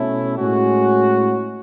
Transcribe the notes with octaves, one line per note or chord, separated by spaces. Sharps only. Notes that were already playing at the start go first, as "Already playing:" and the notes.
Already playing: B2 A3 C#4 E4
A2 G#3 C#4 F#4